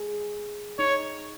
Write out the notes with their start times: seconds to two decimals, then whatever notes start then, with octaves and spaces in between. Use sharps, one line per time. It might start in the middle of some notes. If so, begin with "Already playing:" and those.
Already playing: G#4
0.79 D#4 C#5